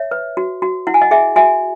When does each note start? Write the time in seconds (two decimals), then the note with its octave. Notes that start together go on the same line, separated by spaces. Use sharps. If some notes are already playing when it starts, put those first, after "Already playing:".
Already playing: C#5 E5
0.11 B4
0.37 F#4
0.62 F#4
0.87 E4 F#5
0.94 G#5
1.01 D#5 F#5
1.11 G#4 E5 G#5
1.36 F#4 E5 G#5